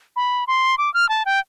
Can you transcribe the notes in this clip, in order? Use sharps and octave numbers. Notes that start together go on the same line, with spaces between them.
B5
C6
D6
F6
A5
G5